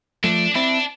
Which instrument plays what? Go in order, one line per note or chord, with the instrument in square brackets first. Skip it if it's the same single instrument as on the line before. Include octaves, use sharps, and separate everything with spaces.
[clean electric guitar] F3 A3 [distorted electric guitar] D4
[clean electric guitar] C4 E4 [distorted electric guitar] D4